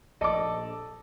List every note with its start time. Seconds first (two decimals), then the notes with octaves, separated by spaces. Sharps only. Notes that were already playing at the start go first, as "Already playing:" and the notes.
0.21 A#1 A4 D5 D#5 D6